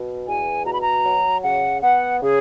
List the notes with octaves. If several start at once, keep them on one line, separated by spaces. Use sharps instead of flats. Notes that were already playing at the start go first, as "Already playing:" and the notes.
Already playing: B2
E2 G#5
B2 A#5
B5
A#5
F#3
C#3 F#5
B3 F#5
C#3 G#4